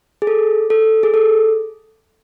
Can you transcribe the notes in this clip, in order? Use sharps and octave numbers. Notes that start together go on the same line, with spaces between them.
G#4
A4
A4
G#4
A4